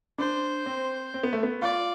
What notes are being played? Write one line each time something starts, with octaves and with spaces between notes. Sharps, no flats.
D4 C5
C4
C4
B3
A3
B3
F4 D5